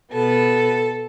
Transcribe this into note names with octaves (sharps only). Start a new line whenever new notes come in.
B2 B3 A4